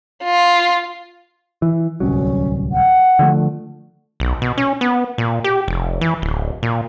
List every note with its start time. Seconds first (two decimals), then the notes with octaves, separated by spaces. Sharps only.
0.25 F4
1.62 E3
2.00 D1 C2 F#3 C#4
2.72 F#5
3.19 D3 F3 A3
4.20 B1
4.42 B2
4.57 C#4
4.81 B3
5.18 A#2
5.44 G4
5.68 F1
6.01 E3
6.22 D1
6.63 A#2